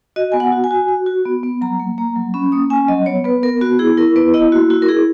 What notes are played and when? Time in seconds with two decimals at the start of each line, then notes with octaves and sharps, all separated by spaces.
0.16 F#4 D#5
0.32 B3 G#5
0.40 F#5
0.52 F#4
0.64 G#5
0.71 F#4
0.88 F#4
1.06 F#4
1.26 B3
1.43 B3
1.61 F#3 A#5
1.80 A#3
1.98 A#3 A#5
2.16 F#3
2.34 C#4 B5
2.52 A#3 D#6
2.70 C#4 G#5
2.88 F#3 D#5
3.06 B3 C#5
3.24 B3 B4
3.43 B3 A#4
3.61 B3 F#4
3.79 E4 G#4
3.97 E4 A#4
4.16 B3 B4
4.34 E4 D#5
4.52 A#3 F#4
4.70 E4 F#4
4.82 A#4
4.88 E4 G#4